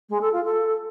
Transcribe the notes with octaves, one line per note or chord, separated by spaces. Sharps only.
G#3
A4
F4
A4